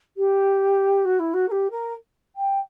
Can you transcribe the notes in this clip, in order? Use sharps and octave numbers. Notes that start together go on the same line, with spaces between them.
G4
F#4
E4
F#4
A#4
G4
A#4
G5